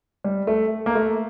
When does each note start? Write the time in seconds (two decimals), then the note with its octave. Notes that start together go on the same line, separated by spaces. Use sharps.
0.24 G3
0.47 A3
0.86 A#3
0.95 A3